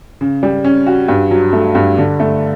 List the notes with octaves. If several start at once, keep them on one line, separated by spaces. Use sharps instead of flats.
C#3
G3
C#4
F#4
G2
F#3
A3
G2
D3
A3